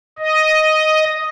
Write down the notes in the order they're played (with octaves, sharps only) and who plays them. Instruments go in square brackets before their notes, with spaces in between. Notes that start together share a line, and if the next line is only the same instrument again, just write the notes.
[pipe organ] D#5